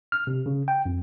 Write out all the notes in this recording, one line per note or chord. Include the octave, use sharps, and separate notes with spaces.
F6
C3
C#3
G5
F2